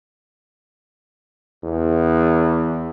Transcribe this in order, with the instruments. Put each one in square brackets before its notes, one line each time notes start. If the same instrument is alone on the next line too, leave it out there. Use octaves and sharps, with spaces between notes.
[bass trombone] E2